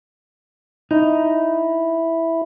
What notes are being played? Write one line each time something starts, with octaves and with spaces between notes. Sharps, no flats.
D#4 E4